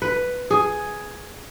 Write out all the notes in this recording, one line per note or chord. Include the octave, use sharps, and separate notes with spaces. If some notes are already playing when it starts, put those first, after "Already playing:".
B4
G#4